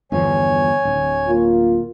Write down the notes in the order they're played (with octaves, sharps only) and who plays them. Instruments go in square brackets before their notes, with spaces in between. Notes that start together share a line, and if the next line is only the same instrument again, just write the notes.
[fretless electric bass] G1 E2 F3 [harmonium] C#5 G#5
[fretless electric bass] D1
[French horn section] A#3 F4